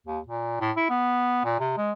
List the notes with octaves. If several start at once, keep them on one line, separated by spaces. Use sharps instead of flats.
D#2
A#2
A2
E4
B3
A#2
C3
G#3